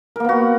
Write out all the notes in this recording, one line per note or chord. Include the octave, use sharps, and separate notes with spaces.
A#3 B3 F#4 A#4